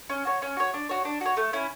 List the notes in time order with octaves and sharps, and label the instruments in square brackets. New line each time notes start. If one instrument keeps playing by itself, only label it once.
[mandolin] C#4
F#4 C#5
C#4
F#4 C#5
D4
F#4 C#5
D4
F#4 C#5
A3
C#4 E4